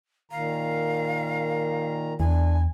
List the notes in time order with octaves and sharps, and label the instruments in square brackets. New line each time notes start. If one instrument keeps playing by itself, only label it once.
[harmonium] A#2 D#3 A#5 [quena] F5
[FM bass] E2 [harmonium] D4 [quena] G#5